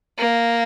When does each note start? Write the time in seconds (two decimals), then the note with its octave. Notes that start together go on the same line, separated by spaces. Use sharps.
0.18 A#3